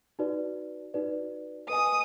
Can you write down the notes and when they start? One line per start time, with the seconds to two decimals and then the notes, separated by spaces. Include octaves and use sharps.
0.19 D#4 F#4 B4 D5
0.94 D#4 F#4 B4 D5
1.69 B4 D#5 G#5 D#6